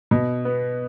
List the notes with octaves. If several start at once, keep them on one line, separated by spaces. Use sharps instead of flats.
B2
B3